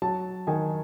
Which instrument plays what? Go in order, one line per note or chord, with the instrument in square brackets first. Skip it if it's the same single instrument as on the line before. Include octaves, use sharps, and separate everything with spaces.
[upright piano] F#3 A5
D#3 G#5